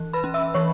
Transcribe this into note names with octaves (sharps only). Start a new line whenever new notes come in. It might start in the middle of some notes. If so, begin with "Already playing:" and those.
Already playing: E3
B4 B5
C#4
E5 E6
E3 C#5 C#6